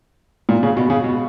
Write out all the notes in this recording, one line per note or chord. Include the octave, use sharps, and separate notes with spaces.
A#2
C#3
B2
C#3
B2